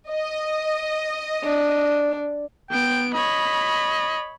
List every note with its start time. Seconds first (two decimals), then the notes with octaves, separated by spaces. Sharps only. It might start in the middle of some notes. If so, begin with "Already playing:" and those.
0.11 D#5
1.44 D4
2.70 B3 G5 D7
3.14 C#5 D#5 B5